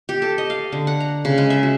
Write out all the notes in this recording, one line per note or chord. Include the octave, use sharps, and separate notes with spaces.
G4
A4
D#5
F5
D3
F#5
A#5
C#3
G#3
E5
F#4